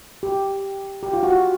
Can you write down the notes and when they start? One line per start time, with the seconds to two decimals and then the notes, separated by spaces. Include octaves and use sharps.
0.23 G4
1.03 G4
1.13 F4
1.23 F#4